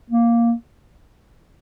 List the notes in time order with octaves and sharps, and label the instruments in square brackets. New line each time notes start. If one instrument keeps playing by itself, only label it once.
[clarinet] A#3